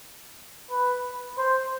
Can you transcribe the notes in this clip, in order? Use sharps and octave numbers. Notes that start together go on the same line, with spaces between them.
B4
C5